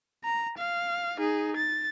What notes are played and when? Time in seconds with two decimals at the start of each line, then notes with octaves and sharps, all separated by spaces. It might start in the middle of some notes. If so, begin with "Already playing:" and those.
0.24 A#5
0.58 F5
1.18 D#4 G#4
1.56 A6